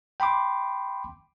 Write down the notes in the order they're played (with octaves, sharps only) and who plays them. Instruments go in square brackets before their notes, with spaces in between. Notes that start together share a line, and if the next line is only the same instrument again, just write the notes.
[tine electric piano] G5 B5 C6 D6